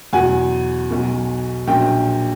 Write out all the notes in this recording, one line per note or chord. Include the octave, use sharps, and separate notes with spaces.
E2 B2 F#3 F#5 G#5
B1 B2 F#3
A#1 A#2 F#3 G5